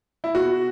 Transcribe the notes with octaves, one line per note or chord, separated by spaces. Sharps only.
E4
B2 F#4